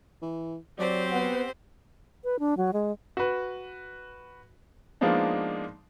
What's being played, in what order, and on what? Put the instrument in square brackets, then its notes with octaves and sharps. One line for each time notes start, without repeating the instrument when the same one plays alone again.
[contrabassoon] E3
[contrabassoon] F#3 [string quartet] C4 G4 C5 [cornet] D5
[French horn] B3 [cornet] F#5
[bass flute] B4
D4
F#3
G#3
[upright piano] F#4 B4
F3 G#3 A#3 B3 D4 D#4